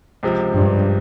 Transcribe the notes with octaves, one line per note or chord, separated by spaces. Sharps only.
C#2 C3 F3
G2